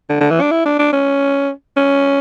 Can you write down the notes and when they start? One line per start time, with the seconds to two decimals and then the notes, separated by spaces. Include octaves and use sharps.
0.10 D3
0.20 D3
0.31 E3
0.41 D4
0.51 E4
0.65 D4
0.79 D4
0.93 C#4
1.76 C#4